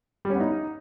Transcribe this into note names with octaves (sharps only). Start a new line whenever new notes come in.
G3
C#4
B3
D#4